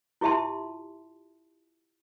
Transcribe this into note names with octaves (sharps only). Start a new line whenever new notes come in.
E4 F4 G4 E5 A5 C6